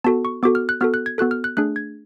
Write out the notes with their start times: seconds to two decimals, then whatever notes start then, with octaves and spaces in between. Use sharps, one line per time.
0.04 B3 F#4 A4 A5
0.25 C#6
0.43 B3 F#4 A4 D6
0.55 F6
0.69 F#6
0.81 B3 F#4 A4 F6
0.94 F#6
1.06 G#6
1.18 B3 F#4 A4 F#6
1.31 F6
1.44 F#6
1.57 A3 D4 G#4 F#6
1.76 G#6